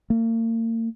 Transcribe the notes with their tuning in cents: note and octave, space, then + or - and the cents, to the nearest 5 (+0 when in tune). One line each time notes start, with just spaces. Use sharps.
A#3 -40